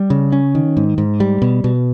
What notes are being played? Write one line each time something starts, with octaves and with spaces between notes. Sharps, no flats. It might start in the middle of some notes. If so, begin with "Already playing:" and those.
Already playing: G3
C#3
C#4
D#3
G#2
G#2
G3
B2
B2